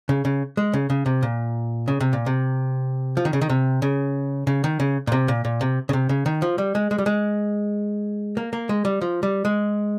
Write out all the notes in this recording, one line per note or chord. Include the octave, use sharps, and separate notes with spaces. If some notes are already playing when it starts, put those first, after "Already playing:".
C#3
C#3
G#3
C#3
C#3
C3
A#2
C#3
C3
A#2
C3
F3
D#3
C#3
D#3
C3
C#3
C#3
D#3
C#3
A#2
C3
A#2
A#2
C3
C#3
C3
C#3
D#3
F3
G3
G#3
G#3
G3
G#3
A#3
A#3
G#3
G3
F3
G3
G#3